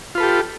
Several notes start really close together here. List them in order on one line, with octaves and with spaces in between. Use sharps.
F4 B4 A4 G4